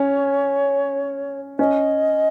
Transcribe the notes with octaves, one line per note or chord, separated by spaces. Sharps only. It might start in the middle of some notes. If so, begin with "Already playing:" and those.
Already playing: C#4 C#5
C#4 D#5